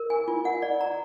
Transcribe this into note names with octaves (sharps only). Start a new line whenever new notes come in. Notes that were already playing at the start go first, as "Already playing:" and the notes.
Already playing: A#4
G#5
F4
F#5
D5
A#5